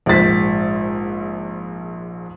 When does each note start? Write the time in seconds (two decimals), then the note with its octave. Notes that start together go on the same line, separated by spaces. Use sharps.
0.06 A#1 G#2 C5 A6 B6